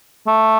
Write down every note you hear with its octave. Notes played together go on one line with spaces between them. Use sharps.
A3